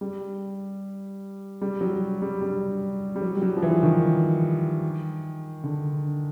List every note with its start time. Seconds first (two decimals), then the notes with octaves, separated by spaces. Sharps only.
0.01 G3
1.61 G3
1.81 F#3
2.22 G3
2.41 G3
3.16 G3
3.22 F#3
3.37 G3
3.42 F#3
3.57 F3
3.62 E3
3.83 D#3
5.64 D3